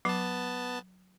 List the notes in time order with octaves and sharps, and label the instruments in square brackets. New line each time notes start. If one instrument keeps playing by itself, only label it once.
[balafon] F#3 [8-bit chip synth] B3 A5